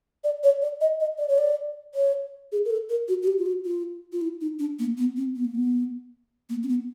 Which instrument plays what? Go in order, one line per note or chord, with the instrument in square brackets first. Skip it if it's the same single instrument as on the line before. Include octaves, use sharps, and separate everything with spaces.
[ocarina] D5
C#5
D5
D#5
D#5
D5
C#5
D5
C#5
G#4
A#4
A4
A#4
F#4
F#4
G4
F4
F#4
F4
F4
E4
D#4
D4
A#3
B3
C4
B3
A#3
B3
A#3
C4
B3